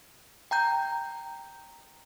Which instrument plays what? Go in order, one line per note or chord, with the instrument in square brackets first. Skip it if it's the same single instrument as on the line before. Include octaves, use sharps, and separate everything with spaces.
[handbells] G5 A#5 G6